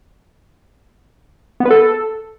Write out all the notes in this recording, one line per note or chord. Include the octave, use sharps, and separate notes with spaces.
B3
B4
A4